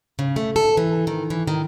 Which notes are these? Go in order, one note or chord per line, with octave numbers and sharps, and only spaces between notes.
C#3
A3
A4
E3
D#3
E3
D#3